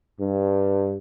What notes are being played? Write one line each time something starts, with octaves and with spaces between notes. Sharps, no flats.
G2